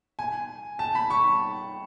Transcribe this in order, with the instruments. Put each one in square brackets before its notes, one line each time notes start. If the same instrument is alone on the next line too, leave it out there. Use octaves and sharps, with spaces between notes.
[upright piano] G#5
A5
B5
C#6